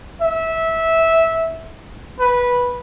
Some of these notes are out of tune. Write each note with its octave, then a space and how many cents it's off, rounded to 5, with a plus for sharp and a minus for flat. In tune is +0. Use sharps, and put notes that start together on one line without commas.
E5 -15
B4 -10